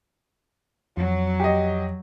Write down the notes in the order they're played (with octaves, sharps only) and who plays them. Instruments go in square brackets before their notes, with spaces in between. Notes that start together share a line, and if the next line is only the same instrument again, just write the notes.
[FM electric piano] F2 [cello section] F#3
[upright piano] G4 D#5